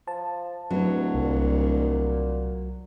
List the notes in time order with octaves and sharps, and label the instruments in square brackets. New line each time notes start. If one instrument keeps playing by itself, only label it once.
[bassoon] F3 [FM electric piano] A5
[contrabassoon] D1 [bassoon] E3 [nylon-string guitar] F#3
[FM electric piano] C2 [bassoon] A#2